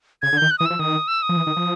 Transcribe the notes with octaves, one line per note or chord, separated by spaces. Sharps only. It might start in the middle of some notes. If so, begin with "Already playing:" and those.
C#3 G#6
D3
D#3 G6
F#6
E3 D#6
F3 E6
D#3 D#6
E6
D#6
F3
E3
D#3
F3